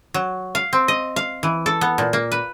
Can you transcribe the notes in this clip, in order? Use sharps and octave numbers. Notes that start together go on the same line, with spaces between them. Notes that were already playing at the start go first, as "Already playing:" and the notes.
F#3
F5
C4
D#5
F5
E3
A4
B3
A#2
A#3
B4